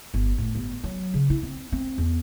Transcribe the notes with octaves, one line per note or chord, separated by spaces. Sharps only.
G1
A2
G1
F#3
C#3
E4
C4
C4
E2